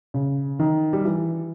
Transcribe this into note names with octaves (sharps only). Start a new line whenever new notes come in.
C#3
D#3
G3
E3